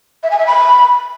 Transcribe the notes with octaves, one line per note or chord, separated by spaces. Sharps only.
E5
G#5
E5
B5